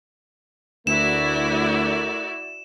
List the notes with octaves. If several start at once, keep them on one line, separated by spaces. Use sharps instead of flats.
D2 A3 E4 F#4 A#4 D5 E7